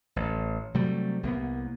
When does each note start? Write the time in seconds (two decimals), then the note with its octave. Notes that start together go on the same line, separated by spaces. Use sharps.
0.16 A1
0.74 C3 F#3 G3 A3
1.23 C2 A#3 B3